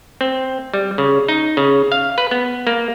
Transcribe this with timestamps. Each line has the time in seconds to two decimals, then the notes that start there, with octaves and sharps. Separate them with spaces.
0.21 C4
0.74 G3
0.98 C#3
1.28 D#4
1.57 C#3
1.92 F5
2.18 B4
2.31 B3
2.67 A#3